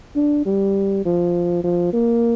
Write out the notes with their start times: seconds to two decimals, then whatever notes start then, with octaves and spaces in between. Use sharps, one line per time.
0.16 D4
0.46 G3
1.05 F3
1.64 F3
1.93 A#3